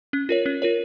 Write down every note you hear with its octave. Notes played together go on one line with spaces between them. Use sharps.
C#4
F4 A#4 C#5
C#4
F4 A#4 C#5